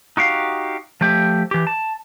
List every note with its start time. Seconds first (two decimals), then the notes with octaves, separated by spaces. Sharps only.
0.17 D#4 F#4 G4 F5
1.01 F3 A3 G4
1.51 E3 G4
1.67 A5